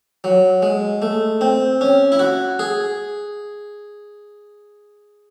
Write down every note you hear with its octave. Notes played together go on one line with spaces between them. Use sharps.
F#3
G#3
A3
C4
C#4
E4
F#4
G#4